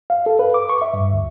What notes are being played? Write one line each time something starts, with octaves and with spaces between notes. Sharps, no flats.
F5
A4
B4
D6
C#6
E5
G2
D2